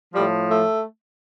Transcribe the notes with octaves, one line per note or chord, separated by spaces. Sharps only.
A2 F3 G3
A3